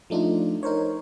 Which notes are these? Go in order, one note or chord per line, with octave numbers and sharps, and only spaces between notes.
F3 A3 D4 D#4 F4
D#4 A#4 C5 C#5